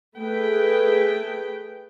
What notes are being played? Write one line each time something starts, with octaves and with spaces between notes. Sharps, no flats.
A3 G#4 B4 G5